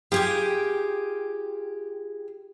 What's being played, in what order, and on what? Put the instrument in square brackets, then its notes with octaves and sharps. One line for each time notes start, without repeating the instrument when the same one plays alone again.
[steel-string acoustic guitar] F4 G#4 G5 [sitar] G4